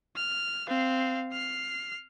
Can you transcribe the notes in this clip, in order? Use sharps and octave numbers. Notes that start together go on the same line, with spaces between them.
F6
C4 F5
F6 C7